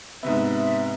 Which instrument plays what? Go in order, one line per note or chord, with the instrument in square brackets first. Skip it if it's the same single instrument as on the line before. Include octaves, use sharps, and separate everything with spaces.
[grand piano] G#2 C3 B3 [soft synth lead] E5